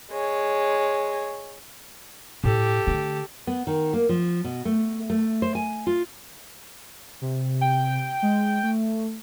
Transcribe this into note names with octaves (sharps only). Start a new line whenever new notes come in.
G#3 C#5
A2 G4 A4
D3 A3
B3
D#3
A#3
F3
B2
A3
A3
C5
G#5
F4
C3
G5
G#3
A3